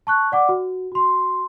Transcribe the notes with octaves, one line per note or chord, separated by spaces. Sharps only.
A5 C#6 F#6
D5 F#5 D6
F#4
F#4 C6